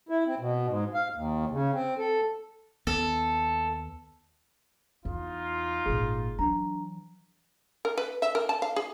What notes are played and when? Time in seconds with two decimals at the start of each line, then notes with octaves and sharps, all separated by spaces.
0.09 E4
0.27 C4
0.40 B2
0.67 G#2
0.94 F5
1.15 D#2
1.51 C#3
1.73 C4
1.98 A4
2.87 D#2 B3 A4
5.05 E2 D#4 F4
5.86 G#1 A#2 G#4
6.39 E3 F#3 D4 A#5
7.85 A#4
7.98 B4
8.22 E5
8.35 A#4
8.49 A5
8.62 F5
8.76 G#4